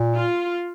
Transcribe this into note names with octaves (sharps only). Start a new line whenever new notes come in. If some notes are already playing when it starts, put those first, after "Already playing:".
Already playing: A#2
F4